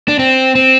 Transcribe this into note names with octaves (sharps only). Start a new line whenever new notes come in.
D4
C4
C4